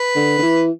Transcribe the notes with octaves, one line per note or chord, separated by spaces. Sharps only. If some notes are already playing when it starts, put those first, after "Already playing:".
Already playing: B4
D3
D3
E3